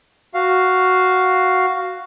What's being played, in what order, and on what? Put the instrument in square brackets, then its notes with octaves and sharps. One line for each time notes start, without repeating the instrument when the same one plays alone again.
[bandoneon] F#4 F5